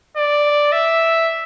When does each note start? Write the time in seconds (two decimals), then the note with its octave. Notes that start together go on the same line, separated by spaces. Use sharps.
0.17 D5
0.72 E5